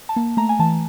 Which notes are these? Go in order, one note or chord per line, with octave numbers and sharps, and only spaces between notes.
A5
A#3
A3 A#5
G#5
E3 A5